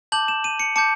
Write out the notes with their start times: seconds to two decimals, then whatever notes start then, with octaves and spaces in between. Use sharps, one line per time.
0.12 A5 D6 G6 F#7
0.28 E7
0.44 D#7
0.60 C#7
0.76 A5 D6 G6 C#7